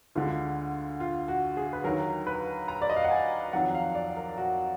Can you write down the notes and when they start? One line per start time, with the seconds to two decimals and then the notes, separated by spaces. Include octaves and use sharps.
0.15 D2 D3 G#3 F4
1.00 F4
1.28 F#4
1.57 G#4
1.73 B4
1.84 D#2 D#3 F#3 A#4
2.27 B4
2.68 A#5
2.82 D5
2.90 D#5
2.96 F5
3.04 F#5
3.11 G#5
3.53 F2 D#3 F#3 F#5
3.75 F5
3.95 D5
4.17 A#4
4.37 F#4